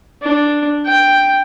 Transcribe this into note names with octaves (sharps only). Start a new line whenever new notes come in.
D4
G5